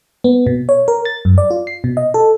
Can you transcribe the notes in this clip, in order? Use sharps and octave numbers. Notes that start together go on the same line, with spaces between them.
B3
B2
C#5
A#4
A6
F#2
D5
F4
C7
B2
D#5
A4